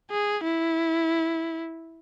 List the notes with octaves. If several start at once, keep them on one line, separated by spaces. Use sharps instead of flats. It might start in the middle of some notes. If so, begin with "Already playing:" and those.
G#4
E4